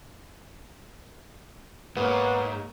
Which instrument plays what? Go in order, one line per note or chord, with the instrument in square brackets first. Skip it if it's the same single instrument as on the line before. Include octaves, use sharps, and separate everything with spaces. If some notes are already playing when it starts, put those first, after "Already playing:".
[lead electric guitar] G#2 [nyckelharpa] A#3 C#5 [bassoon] B3